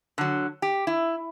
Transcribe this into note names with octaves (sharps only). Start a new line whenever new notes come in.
D3 F#3
G4
E4